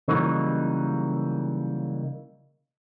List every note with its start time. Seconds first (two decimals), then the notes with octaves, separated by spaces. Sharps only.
0.08 C#3 E3 F#3 G3 A#3 D#4